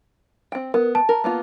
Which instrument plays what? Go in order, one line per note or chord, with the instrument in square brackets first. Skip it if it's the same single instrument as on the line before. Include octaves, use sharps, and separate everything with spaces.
[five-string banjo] C4 G5
[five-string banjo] B3 [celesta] A#4
[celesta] A5
[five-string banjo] A#4
A#3 B3 F4